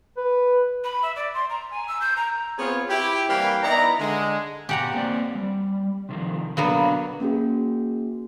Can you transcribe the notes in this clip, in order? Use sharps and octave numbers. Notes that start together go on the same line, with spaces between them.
B4
B5
E5
D5
C6
A#5
G#5
E6
G6
A#5
B3 C4 F4 G#4 C5 C#5
E4 G4
E3 G3 A#3 C4 F5 G5
B3 D#4 E4 D5 A#5
D3 G#3
B2 G4 F#5 G#5 A#5
A#3 C4 D5
G3
C3 D#3 F3
B2 D3 F#3 A#3 B3 D4
A#3 C#4 F#4 G#4